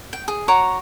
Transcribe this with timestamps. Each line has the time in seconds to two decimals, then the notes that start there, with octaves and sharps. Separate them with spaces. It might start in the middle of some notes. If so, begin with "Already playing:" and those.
0.13 G5
0.28 G#4
0.48 F#4 C#5 A#5 D6